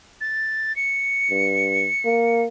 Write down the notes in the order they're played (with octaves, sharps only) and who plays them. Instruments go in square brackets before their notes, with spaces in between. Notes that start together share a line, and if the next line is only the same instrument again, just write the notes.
[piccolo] A6
C#7
[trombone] G2
A#3